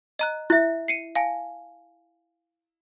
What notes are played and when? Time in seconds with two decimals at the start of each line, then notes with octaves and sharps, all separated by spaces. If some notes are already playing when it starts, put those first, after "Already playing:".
0.19 D#5 A#5 F#6
0.50 E4 E5 F#6
0.88 C7 C#7 D#7
1.15 F5 G#5 A5